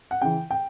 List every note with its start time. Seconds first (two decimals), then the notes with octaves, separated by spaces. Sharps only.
0.11 F#5
0.22 C#3 E3 G5
0.51 G5